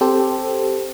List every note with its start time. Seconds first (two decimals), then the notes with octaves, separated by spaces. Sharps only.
0.01 C4 G4 A4 C5